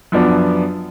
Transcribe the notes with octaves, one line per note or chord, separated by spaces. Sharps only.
F#2 F3 B3 D4